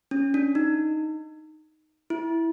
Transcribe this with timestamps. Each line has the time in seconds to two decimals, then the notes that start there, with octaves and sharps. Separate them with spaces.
0.11 C#4
0.34 D4
0.55 D#4
2.10 E4